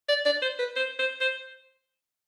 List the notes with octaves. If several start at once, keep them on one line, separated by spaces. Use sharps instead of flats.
D5
D5
C5
B4
C5
C5
C5